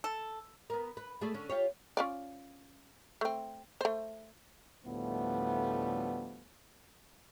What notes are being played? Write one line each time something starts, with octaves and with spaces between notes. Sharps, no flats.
A4
B3 A#4
B4
A3 G#4 D5
D3 C#4
F4 G4 C#5
C#4 F4 D5
A3 C4
A3 C5
D2 A2 F3 G3 A3 B3